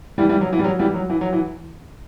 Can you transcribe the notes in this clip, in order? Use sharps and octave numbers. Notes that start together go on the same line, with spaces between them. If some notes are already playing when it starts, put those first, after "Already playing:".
E3 G3
E3 G3
F#3
E3
G3
F#3
E3 G3
F#3
E3
F#3
E3